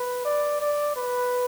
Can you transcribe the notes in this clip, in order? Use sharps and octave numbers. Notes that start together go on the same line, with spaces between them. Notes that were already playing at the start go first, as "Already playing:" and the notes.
Already playing: B4
D5
D5
B4